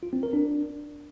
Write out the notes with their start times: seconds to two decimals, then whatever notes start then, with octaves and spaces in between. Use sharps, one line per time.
0.03 F4
0.13 C4
0.23 A#4
0.33 D4